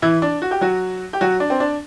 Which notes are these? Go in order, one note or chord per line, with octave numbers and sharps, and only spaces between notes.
E3 E4
D4
F#4
G4
F#3 F#4
G4
F#3 F#4
D4
C4
D4